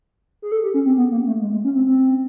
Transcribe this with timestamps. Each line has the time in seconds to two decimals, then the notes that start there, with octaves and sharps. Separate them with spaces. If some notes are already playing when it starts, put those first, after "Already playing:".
0.42 G#4
0.52 A4
0.64 G4
0.74 C#4
0.86 C4
0.97 B3
1.11 A#3
1.27 A3
1.41 G#3
1.52 G#3
1.65 C#4
1.75 C4
1.86 C4